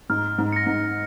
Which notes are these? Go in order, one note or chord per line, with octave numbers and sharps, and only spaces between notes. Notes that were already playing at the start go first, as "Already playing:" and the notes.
G#2 F6
G#2
A#6 C#7
G#2